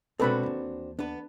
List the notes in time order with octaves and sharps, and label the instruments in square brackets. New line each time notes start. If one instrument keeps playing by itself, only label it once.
[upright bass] B2 G#3 [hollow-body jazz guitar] C4 D4 F#4 [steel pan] A4 B4 B5
[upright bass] D#2 E3
[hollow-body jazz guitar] B3 B4 [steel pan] D4